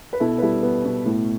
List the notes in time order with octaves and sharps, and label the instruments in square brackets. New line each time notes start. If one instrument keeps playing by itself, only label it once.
[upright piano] B4
B2 E4 A4
B4
G3 E4 A4
B3
B2
A2